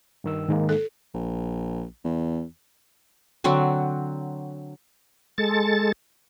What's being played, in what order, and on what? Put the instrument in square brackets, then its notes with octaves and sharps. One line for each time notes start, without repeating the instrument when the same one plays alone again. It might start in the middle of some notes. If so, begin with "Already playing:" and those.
[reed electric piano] G2 D#3 E6
[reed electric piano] G#2 G#3 A#3 [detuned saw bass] D#3
[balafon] A4
[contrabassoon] A#1
E2
[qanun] D3 F#3 C4 F#4
[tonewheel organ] G#3 A4 A6